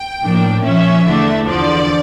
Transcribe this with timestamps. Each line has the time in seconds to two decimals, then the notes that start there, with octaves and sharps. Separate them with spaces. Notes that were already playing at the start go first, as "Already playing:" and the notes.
Already playing: G5
0.22 A2 F3 A#3 D4
0.63 A#2 F3 C#4 E5
1.05 E2 D3 A3 D4
1.47 E2 D3 F3 D5